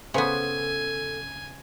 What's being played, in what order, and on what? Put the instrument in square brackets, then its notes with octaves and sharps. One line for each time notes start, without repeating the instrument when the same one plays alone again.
[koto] C#3 B3 [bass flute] A4 [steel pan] B4 C5 C#6 [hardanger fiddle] G#5